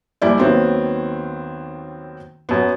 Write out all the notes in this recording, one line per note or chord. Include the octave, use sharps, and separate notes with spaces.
F#1 G3 E4 D5
D#2 D#3 F#3 B3 C4
F#2 B3